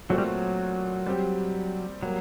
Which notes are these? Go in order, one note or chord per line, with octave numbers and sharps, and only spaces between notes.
A#2 F#3 A3 C4 F#4
G3
F#3
G3 C4 G4
F#3 G3 A#3